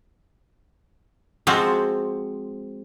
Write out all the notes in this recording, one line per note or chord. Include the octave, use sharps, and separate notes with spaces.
F3 G#3 C4 F#4